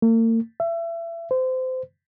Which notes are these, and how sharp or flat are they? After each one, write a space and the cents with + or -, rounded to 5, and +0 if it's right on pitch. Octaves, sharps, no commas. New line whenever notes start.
A#3 -45
E5 +30
C5 -25